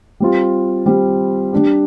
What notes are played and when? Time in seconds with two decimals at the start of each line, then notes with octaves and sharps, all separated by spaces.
0.20 G3 C4 F4
0.86 G3 C4 F4
1.53 G3 D4 G4